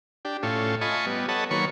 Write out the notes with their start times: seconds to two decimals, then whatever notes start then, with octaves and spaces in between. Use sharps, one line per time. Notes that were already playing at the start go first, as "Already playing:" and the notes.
0.25 D4 G4
0.43 A2 C#4 F4 A4
0.81 F4 D#5 G#5 A5 B5 C#6
1.07 G3 B3
1.29 A4 B4 C#5 D#5 F#5 A5
1.51 D#3 F#3 A#3 C#5 B5 C#6